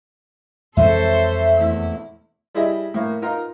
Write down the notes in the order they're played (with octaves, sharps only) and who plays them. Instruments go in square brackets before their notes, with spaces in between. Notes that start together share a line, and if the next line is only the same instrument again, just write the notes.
[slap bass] F2 E3 G#3 [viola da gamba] A4 C5 C#5 [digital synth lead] E5
[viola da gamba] E2 A3 E4
[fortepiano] G3 E4 G#4 D#5 E5
A2 A#3
D#4 F4 A#4 A#5